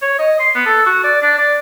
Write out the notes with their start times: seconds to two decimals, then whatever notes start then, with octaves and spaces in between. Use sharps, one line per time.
0.02 C#5
0.19 D#5
0.40 C6
0.55 B3
0.66 A4
0.86 F#4
1.04 D5
1.22 D4
1.38 D5